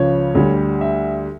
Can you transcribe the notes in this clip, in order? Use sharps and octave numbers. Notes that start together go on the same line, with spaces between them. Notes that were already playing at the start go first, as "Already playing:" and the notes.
Already playing: C#2 C#3 F3 C#5
D2 D3 G3
E5